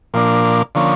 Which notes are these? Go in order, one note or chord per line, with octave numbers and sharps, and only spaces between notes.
A#2 F3 A#3 D4
D3 F3 A#3 C#4